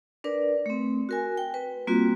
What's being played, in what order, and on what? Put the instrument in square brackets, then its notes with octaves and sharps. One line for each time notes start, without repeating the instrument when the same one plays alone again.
[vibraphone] D4 A#4 B4 D5
A3 C4
F#4 A#4 G#5
G5
B4
G3 A#3 C4 F4 F#4